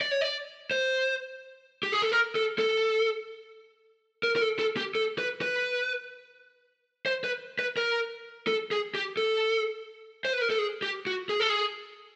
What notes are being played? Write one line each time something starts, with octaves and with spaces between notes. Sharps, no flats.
D5
C#5
D5
C5
G4
G#4
A4
A#4
A4
A4
A#4
A#4
A4
A4
G4
A4
B4
B4
C5
B4
B4
A#4
A4
G#4
G4
A4
C5
B4
A#4
A4
G#4
G4
F#4
G#4
A4
G#4